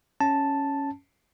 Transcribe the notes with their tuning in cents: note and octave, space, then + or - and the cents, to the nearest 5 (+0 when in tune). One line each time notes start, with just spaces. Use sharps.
C#4 +0 A5 +0